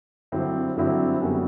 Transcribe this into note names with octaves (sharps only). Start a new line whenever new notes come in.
G2 D3 F#3 C4 E4
G2 D3 F#3 C4 E4
F#2 D3 G3 B3 F#4